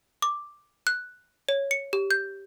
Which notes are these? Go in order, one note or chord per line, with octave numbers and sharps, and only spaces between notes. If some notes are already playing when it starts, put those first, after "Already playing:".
D6
F#6
C#5
C#7
G4
G6